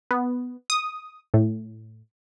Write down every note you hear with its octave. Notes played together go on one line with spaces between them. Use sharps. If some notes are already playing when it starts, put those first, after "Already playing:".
B3
D#6
A2